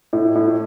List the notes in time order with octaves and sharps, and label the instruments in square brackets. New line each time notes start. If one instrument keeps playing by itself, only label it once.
[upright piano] A2
A2